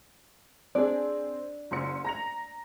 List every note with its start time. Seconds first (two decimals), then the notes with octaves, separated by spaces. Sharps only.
0.75 C4 D4 G#4 D5
1.71 F#1 C6 C#7
2.05 A#5 A#6 F7